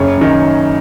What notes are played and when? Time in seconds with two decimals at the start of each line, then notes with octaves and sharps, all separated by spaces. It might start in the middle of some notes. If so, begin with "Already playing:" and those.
Already playing: F#1 C#5
0.17 F#2 D#3